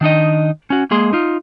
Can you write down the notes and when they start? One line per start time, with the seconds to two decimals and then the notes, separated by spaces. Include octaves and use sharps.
0.01 D#3 D4 D#4 D#5
0.70 C#4 F#4
0.91 G#3 A#3 G#4 C6
1.13 D#4 F4